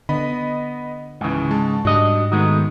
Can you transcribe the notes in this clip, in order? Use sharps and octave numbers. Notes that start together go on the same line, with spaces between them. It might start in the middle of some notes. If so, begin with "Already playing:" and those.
D3 B3 D#5 B5
C#2 G#2 C#3 E3
G#3 A5
G#2 G3 D4 F#4 D#5
D#3 G#3 A3 B3 D#4 F#4